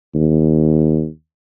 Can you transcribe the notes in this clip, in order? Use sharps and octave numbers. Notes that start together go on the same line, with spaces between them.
D#2